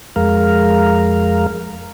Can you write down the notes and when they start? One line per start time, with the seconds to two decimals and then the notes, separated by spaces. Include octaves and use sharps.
0.16 F2 G#3 A#4 F5